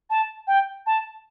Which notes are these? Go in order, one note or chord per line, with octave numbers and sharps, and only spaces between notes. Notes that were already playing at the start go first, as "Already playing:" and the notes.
A5
G5
A5